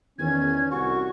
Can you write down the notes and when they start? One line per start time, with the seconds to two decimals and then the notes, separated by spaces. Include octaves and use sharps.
0.19 E2 D#3 C#4 G#6
0.71 C2 F#4 C#6